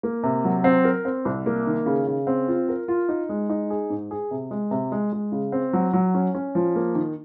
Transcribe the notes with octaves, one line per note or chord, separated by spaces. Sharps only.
A#3
C3
F#3
C4
A#4
C4
C2
A#3
D#3
C#3
C#3
C4
F4
A#4
F4
D#4
G#3
D#4
G#4
G#2
G#4
C3
G#3
C3
G#3
G#3
C#3
C4
F#3
F#3
C#4
C#4
F3
A#3
D#3